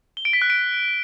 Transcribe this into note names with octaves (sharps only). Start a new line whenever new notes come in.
G7
D7
B6
F#6
D7